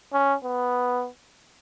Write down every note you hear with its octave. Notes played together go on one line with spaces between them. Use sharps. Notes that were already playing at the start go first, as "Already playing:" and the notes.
C#4
B3